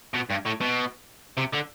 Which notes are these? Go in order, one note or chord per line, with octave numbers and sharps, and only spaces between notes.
B2
G2
A2
B2
C3
D3